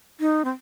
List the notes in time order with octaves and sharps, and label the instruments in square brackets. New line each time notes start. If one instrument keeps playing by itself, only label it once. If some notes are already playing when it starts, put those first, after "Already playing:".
[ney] D#4
C4